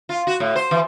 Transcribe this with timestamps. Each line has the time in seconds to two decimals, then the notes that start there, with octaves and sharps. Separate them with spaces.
0.09 F4
0.27 F#4
0.40 A2
0.55 C5
0.71 E3